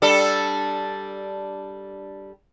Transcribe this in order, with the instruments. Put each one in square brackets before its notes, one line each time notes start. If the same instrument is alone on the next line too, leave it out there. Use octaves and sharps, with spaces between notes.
[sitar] G3 D4 A4